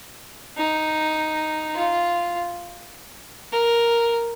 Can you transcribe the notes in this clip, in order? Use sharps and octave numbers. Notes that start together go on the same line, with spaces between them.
D#4
F4
A#4